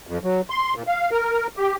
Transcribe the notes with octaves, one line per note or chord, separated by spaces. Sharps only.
F2
F#3
C6
A#2
F5
A#4
G4